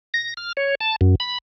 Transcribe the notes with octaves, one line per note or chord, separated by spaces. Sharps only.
A#6
F6
C#5
A5
F#2
B5